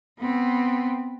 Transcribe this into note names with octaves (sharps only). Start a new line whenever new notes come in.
B3 C4